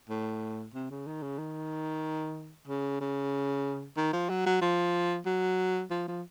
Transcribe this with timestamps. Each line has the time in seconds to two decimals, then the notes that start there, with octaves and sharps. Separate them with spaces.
0.10 A2
0.74 C3
0.91 C#3
1.07 D#3
1.23 C#3
1.38 D#3
2.68 C#3
3.01 C#3
3.97 D#3
4.13 F3
4.30 F#3
4.46 F#3
4.61 F3
5.26 F#3
5.91 F3
6.08 F3